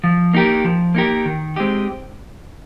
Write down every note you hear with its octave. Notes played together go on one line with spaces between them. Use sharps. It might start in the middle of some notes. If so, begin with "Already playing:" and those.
F3
A#3 D#4 G4 A#4
F3
A#3 D#4 G4 A#4
D#3
G#3 C4 D#4 G4